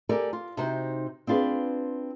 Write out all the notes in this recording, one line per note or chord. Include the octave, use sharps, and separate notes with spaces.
G4 A4 A#4 D5 G#5
F4
C3 D#4 F#4 C5
C4 D4 F4 G#4 B4